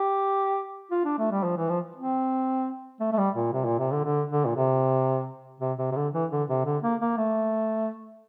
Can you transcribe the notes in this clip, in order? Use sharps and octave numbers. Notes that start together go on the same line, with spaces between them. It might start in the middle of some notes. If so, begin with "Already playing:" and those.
Already playing: G4
F4
D4
A3
G3
F3
E3
F3
C4
A3
A3
G3
A#2
C3
A#2
C3
D3
D3
D3
A#2
C3
C3
C3
C3
D3
E3
D3
C3
D3
A#3
A#3
A3